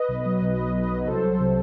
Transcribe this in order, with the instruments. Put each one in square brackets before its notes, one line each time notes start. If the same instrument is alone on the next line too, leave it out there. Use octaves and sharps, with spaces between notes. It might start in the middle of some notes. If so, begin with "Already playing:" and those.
Already playing: [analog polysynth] B4 D#5
B1
F#3
B2
B1
B1
F#3
C2 A4 C5
F#3
C3